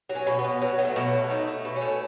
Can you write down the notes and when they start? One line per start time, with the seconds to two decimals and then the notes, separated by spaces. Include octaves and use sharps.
0.09 F#3
0.15 C#4
0.27 B2
0.39 B3
0.45 B2
0.62 F#3 B3
0.78 F#3 B3
0.85 A3
0.96 B2
1.08 A3
1.13 F#3
1.30 A3 D#4
1.48 A3
1.65 B2
1.76 C#4
1.82 A3